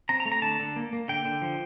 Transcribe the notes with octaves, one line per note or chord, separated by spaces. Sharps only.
C4 A#5
A#5
A3
A#5
D3 A5
D3
A#3
A#3
D3 G5
D3
F3